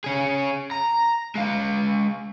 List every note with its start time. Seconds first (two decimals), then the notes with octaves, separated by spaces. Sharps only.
0.04 C#4 G#4
0.71 A#5
1.35 G#3 F5